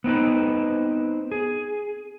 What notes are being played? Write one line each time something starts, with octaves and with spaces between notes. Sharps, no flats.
B3 C4 D#4 B4
G#4